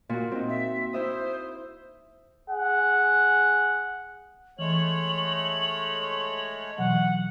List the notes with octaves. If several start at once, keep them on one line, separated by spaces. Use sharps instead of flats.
A#2 F#4
C4 D#4
E5
E4 C5 E5 D#6
G#4 F#5
E3 G#3 A3 C#5 F#7
B2 E3 F#3 F#5